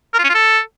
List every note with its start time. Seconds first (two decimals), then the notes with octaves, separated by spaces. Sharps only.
0.14 A#4
0.19 F4
0.24 C#4
0.29 F4
0.35 A4